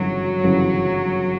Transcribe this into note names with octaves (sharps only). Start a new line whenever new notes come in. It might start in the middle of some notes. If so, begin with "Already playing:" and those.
Already playing: G1 F#2 C#3 E3 F#3
G1 F#2 C#3 E3